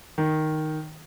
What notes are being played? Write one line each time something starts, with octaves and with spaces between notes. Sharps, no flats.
D#3